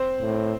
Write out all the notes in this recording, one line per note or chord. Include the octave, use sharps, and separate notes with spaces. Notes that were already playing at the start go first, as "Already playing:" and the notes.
Already playing: C4 C5
A2